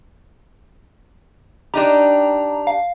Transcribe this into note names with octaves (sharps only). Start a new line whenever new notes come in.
D4 D#4 G4 A#5
F5